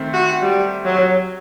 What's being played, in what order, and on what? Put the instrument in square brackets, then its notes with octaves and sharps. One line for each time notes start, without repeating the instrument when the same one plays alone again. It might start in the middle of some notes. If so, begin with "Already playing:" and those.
Already playing: [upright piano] D#3 A3 C4
[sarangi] F#4
G3
F#3